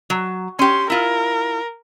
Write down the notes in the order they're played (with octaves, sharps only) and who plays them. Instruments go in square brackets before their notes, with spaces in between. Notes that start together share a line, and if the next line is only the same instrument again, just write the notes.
[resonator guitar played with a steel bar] F#3
[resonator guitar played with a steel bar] C#4 G4 [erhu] C6
[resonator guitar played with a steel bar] E4 F4 [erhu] A#4